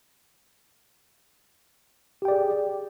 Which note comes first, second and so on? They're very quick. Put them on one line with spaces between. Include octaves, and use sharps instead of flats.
G4 G5 D5 G#4